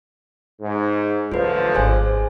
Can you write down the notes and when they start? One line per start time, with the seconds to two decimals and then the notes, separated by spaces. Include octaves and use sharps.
0.61 G#2
1.32 A1 D3 F3 F#3 F4 B4
1.74 D#1 G#1 G#4 C5 G#5